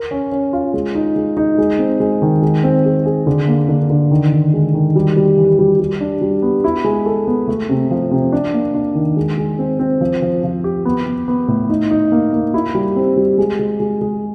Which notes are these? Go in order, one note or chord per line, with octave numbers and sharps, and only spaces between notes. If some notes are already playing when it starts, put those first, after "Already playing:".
Already playing: A#4
C#4
C#4
F4
G#3
D#4
G#3
D#4
G#3
C4
G#3
D#3
G#3
C4
G#4
G#4
D3
A#3
D3
D3
D#3
D#3
G#3
D#3
G3
G3
E3
G3
G3
D4
G3
B3
E4
G#3
A4
B3
A3
C3
F3
C3
D4
A#3
D4
D#3
G#3
G#3
C4
C4
F3
F3
F3
G4
B3
B3
B3
A2
D#4
D#4
A#3
A#3
E4
G3
C4
G3
G#3
G#3
G#3
G#3